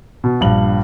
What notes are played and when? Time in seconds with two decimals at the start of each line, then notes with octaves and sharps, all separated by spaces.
0.24 B2
0.41 A#1 G2 F#7